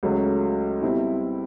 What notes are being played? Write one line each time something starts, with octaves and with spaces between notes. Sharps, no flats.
C#2 C#3 F#3 A3
B2 G3 C4 E4